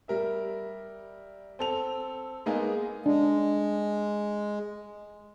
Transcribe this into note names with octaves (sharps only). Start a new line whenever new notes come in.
G3 A#4 E5
C4 A4 F7
G#3 A#3 B3 D#4 G#4
G#3 D4